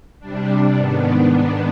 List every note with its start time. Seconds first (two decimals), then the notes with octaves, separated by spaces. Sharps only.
0.20 C3 G3 D4
0.76 G#2 D#3 B3 D4